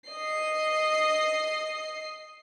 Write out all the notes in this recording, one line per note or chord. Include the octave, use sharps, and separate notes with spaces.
D#5 C7